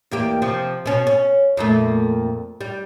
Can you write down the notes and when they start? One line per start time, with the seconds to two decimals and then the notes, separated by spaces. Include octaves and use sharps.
0.11 E2 A#3 G4
0.42 C3 F3 C4
0.86 B2 C#4
1.07 C#4
1.57 F2 A#2 A3
2.61 G3